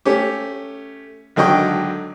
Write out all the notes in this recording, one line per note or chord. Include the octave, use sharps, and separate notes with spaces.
A3 C#4 G4
G#1 D3 F#3 D#5 G5 C#6